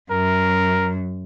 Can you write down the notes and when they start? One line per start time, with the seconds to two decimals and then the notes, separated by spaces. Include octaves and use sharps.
0.11 F#2 A#4